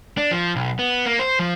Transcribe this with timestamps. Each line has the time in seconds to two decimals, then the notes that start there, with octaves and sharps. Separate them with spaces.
0.17 D4
0.31 F3
0.56 B1
0.79 B3
1.06 A#3
1.19 C5
1.39 F3